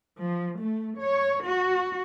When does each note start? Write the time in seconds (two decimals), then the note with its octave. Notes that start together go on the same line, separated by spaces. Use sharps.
0.20 F3
0.61 A3
1.00 C#5
1.45 F#4